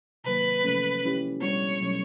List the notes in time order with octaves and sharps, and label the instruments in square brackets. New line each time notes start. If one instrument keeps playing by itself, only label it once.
[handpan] C3 D#3 F#3 A#3 [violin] B4
[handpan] C3 F3 A3 C#4
G#3 C#4 E4 G4
[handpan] A#2 G3 B3 D4 F#4 [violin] C#5
[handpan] B2 F#3 A3 C#4